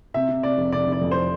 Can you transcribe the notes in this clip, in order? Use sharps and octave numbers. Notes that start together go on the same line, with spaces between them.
C3 E5
C3
C3 D5
F1
C3 D5
F1
D5
F2
C5